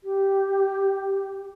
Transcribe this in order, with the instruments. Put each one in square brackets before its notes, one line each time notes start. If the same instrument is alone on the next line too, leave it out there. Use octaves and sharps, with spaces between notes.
[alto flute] G4